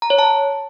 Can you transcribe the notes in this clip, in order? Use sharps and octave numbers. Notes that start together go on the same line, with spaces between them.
A#5
C#5
A5